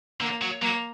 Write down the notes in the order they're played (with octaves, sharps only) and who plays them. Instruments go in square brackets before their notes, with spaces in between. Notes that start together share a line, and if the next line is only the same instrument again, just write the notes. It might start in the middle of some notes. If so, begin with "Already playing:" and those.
[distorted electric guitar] D3 [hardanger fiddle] A#3
[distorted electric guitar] F#3
[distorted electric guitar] F#3 [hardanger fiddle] A#3